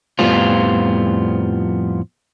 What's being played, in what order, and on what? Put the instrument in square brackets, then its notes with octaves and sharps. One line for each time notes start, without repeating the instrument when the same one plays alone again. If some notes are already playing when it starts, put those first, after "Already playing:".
[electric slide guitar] F2 A2 F3 G3 B3 F4